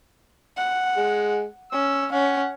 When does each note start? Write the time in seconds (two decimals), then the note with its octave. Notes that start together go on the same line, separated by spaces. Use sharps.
0.57 F#5
0.97 G#3
1.72 C#4 E6
2.12 C#4 F#5